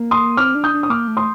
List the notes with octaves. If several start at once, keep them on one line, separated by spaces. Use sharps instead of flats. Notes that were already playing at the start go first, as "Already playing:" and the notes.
Already playing: A#3
C6 D#6
C4 D6 F6
D4
D#6 G6
D4
D#6
A#3 D6 F6
A3
C6 D#6